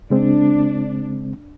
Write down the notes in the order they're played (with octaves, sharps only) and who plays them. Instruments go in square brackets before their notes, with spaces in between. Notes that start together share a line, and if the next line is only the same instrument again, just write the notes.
[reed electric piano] C#3 G#3 C4 [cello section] D4